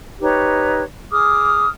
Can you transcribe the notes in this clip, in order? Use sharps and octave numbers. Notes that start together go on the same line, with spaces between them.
D#4 G4 B4 C#5
G#4 D6 D#6 F6